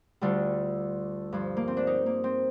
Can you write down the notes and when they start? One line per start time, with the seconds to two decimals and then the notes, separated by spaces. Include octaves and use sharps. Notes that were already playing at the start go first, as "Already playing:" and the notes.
0.21 D2 D3 G3 F4
1.33 G2 F3
1.57 A#3
1.67 C4
1.77 D4
1.87 D#4
2.06 A#3
2.24 C4